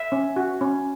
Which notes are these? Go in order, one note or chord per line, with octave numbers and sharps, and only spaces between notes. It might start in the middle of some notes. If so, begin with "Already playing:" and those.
Already playing: E5
C#4
F#4
C#4